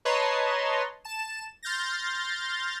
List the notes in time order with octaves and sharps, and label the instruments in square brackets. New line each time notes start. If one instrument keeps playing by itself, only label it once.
[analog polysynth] B4 C#5 D#5 A5 A#5 C6
A5 E7
C6 F6 G6 A6 A#6